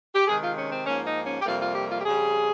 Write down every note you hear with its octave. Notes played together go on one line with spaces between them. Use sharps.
G4
C3 D#3 G#3 G#4
F4
C#4
C4
G#2 F3 A#3 C#4
D#4
C#4
G4
F2 C3 G3 A#3 F4
F4
G4
F4
G4
F2 C#3 G3 G#4